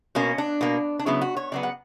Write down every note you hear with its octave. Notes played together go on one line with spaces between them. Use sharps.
B2 A#3 C#4
D4
B2 A#3
D4
C#3 F#3 B3 E4
F#4
C#5
C#3 F#3 B3 D5
F#5